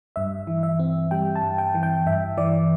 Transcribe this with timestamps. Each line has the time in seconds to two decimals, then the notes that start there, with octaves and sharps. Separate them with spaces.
0.16 G2 E5
0.47 E3
0.63 E5
0.79 C4
1.11 G3 G5
1.36 A5
1.43 G2
1.58 G5
1.75 E3
1.83 G5
2.06 G2 E5
2.37 E3 D5